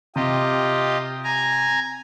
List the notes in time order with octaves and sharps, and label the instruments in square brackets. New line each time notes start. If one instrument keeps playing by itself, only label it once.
[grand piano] C3 [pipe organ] F4 G4 D#5
[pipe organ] G#5 A#5